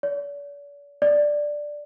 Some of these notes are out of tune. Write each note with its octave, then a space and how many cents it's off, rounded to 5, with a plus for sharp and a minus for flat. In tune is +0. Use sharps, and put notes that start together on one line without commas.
D5 -45
D5 +5